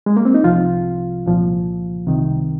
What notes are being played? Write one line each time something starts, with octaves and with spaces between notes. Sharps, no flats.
G#3
A#3
C4
D#4
C2 C3 F3 F4
C2 A#2 F3
C2 C3 D#3